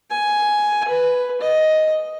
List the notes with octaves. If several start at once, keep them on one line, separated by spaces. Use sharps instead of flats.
G#5
B4
D#5